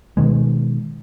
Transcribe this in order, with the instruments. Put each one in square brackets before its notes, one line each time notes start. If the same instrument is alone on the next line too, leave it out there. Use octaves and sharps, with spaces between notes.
[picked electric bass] B2 D#3 G#3